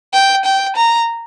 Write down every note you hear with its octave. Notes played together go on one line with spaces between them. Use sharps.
G5
G5
A#5